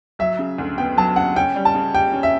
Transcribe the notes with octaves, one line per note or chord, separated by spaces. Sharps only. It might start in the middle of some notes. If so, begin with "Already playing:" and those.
F#3 E5
C#3
D2
B3 G5
F#3 A5
C#3 F#5
C#4 G5
G3
A5
C#3
G4 G5
C#4
E5